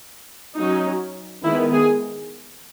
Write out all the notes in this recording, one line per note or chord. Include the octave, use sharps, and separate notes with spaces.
F#3 C#4 D#4
D#3 G#3 B3 E4
G#4